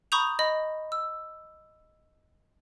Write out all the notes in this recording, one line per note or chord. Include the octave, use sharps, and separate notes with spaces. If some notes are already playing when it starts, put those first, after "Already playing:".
A#5 B5 C#6 D#6 G6 F7
D#5 B5
E6